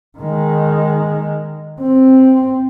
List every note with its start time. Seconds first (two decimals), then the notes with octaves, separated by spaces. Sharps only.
0.18 D#3 G#3
1.81 C4